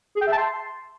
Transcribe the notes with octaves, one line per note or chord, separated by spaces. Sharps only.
G#4
G5
E5
A5
C6